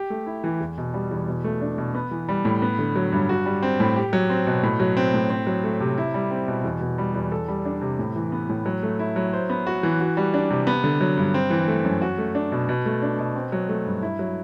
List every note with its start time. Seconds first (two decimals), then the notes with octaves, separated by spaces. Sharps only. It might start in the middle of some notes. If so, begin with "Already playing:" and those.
Already playing: G4
0.10 A3
0.26 E4
0.44 E3
0.61 E2
0.78 B2
0.94 G3
1.11 E2
1.28 B2
1.44 A3
1.61 D4
1.78 B2
1.95 B3
2.11 E3
2.29 G3
2.45 A2
2.62 B3
2.79 D3
2.96 F#3
3.12 G2
3.29 F#4
3.46 G3
3.63 C4
3.80 A2
3.96 G4
4.13 F#3
4.30 C4
4.47 B2
4.63 A2
4.80 F#3
4.97 C4
5.14 A2
5.30 C4
5.47 F#3
5.64 A3
5.80 C3
5.98 E4
6.14 G3
6.31 C4
6.48 B2
6.64 E2
6.81 B2
6.98 G3
7.15 E2
7.32 A4
7.48 G3
7.65 D4
7.81 C3
7.99 A2
8.16 E3
8.32 B3
8.49 A2
8.66 F#3
8.83 A3
8.99 E4
9.16 F#3
9.33 C5
9.50 B3
9.67 F#4
9.83 E3
10.00 F#4
10.17 G3
10.34 D4
10.50 C3
10.67 B3
10.84 D3
11.01 F#3
11.17 G2
11.34 C4
11.50 E3
11.68 A3
11.84 F#2
12.02 F#4
12.18 A3
12.35 D4
12.52 B2
12.69 B2
12.86 A3
13.02 D4
13.19 B2
13.35 C4
13.52 F#3
13.69 A3
13.86 G2
14.02 E4
14.19 F#3